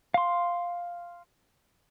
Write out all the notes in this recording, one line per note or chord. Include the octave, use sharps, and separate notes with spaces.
F5 C6